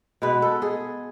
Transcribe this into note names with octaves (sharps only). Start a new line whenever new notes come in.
B2 G#3 B3 B4
A4
G#4